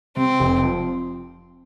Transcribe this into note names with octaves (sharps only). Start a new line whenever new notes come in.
C3 C4
F1
F3